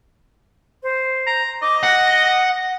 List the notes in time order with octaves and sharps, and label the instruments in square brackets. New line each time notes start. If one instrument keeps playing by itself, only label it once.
[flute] C5
[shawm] A#5
[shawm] D#5 [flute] D6
[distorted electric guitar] F#5 [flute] A#6